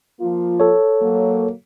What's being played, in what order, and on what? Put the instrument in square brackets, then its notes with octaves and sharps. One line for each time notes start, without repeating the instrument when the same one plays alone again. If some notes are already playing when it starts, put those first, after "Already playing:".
[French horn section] F3 A#3 F4
[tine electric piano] A4 C#5
[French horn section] F#3 A#3